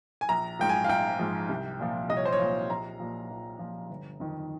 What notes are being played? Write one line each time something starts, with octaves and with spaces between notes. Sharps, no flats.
G#5
A#1 A#5
G#2 F3 G5
G#5
F5
A#1 G5
G#2 F3
C2
A#2 F3
C2 D#5
C#5
C5
C#5
A#2 F3
A#1 A#5
A#2 F3
A#1
A#2 F3
G1
F2 D#3